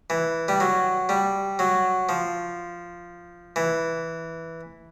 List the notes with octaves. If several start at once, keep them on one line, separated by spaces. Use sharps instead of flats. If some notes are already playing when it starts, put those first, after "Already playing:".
E3
G3
F#3
G3
F#3
F3
E3